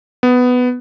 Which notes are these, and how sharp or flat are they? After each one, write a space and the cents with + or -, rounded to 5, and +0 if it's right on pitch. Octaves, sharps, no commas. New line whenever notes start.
B3 +10